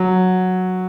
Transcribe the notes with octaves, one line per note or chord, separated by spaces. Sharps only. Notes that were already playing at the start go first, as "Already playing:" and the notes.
Already playing: F#3